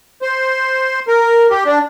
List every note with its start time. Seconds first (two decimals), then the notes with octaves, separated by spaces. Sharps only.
0.22 C5
1.08 A#4
1.51 G4
1.66 D4